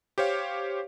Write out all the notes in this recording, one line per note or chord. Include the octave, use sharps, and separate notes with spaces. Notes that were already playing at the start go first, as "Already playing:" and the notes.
G4 C5 C#5 F5